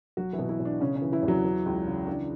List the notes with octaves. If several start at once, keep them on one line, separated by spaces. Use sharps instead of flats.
B1 F#3 F#4
E3 E4
B2
E3 E4
B2
D4
C#3 C#4
C#4
E3
E3 E4
E2
F#3 F#4
E3
C#2
C#3
E3 D4